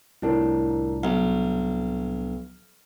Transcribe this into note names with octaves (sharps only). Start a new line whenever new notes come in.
C2 A2 D4 E4 F4 A#4
B1 F6